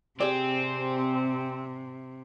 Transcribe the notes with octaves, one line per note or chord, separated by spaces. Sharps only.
C3 C4 G4 G#4 D5